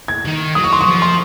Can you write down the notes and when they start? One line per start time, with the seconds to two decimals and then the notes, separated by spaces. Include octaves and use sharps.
0.08 G#6
0.25 D#3
0.55 F#3 D#6
0.64 C#6
0.73 C6
0.81 C#6
0.86 F3
1.02 C6